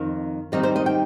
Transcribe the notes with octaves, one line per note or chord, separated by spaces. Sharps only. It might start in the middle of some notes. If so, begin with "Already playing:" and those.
Already playing: F2 D#3
D#2 D#3 G3 C4 D#4 D#5
C5
D#5
G5